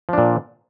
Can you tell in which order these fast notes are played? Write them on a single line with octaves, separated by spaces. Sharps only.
F3 D4 A#2